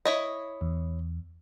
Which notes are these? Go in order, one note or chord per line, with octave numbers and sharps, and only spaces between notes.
E4 C#5 D#5
E2